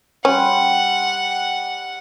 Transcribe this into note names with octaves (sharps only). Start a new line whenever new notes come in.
G3 C#4 F#5 G5 C6